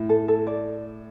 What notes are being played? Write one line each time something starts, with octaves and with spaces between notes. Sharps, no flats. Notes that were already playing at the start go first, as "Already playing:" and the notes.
Already playing: A2
A4
A4
D5